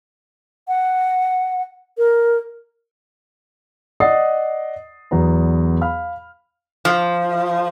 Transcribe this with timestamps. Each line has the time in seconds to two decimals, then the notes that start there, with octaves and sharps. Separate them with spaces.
0.68 F#5
1.98 A#4
4.00 D5 D#5 F#5 D#6 A6 C7
5.11 E2 F#3 B3 A#5
5.81 F5 B5 F6
6.85 F3